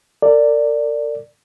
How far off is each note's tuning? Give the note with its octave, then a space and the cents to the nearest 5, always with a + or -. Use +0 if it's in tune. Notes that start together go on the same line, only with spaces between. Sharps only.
A#4 -40 D5 +0